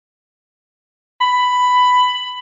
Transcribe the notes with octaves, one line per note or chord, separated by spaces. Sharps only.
B5